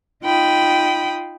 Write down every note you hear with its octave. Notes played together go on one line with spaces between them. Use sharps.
D#4 F4 G5 B5 D#6